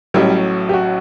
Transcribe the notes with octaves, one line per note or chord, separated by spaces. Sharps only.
A1 A2 F#3 G3
G4
F#4